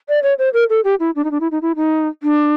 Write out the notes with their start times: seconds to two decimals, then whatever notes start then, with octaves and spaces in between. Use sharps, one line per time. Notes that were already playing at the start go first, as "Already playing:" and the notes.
0.09 D5
0.23 C#5
0.38 C5
0.53 A#4
0.70 A4
0.84 G4
1.00 E4
1.15 D4
1.24 D#4
1.31 D4
1.40 E4
1.51 D#4
1.62 E4
1.76 D#4
2.23 D4